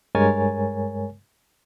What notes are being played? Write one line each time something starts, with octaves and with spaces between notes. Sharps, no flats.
G2 G#3 A#4 C#5 G#5 A6